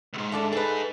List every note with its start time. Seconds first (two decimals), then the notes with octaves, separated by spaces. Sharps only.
0.13 C#2 G#2
0.32 A3 D4 A4
0.52 D#4 G#4 A4 B4